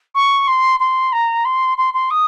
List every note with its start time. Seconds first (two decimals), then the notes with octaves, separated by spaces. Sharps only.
0.15 C#6
0.47 C6
0.80 C6
1.12 A#5
1.45 C6
1.78 C6
1.94 C6
2.10 D#6